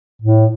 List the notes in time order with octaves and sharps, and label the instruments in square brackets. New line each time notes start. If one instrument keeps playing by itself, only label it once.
[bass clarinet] A2